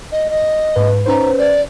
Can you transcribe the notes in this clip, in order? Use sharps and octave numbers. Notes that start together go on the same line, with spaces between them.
D#5
D#5
G#2 B4
C#4 D#4 B4 C5
D5